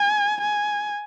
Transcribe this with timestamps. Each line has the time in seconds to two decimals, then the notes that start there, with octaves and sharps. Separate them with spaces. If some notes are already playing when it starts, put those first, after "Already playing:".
Already playing: G#5
0.41 G#5